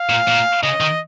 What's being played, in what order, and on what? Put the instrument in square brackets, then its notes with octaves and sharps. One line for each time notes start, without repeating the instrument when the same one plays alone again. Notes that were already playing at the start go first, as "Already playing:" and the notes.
Already playing: [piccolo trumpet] F5
[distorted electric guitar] A#2
A#2
[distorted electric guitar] C#3 [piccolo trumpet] D#5
[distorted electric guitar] D#3